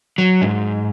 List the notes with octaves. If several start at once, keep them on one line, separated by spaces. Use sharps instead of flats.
F#3
G#2